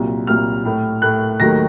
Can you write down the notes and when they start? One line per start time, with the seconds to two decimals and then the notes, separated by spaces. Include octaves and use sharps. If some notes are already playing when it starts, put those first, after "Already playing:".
Already playing: C2 A#2 F#3
0.27 C2 A#2 F#3 F6
0.65 A2 A3
1.02 A2 A3 F#6
1.40 D#2 D#3 F#3 A3 A#6